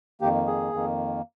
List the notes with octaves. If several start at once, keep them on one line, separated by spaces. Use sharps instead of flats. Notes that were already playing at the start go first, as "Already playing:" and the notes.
F2 D#3 A#3 G4
G#4
F2 D#3 A#3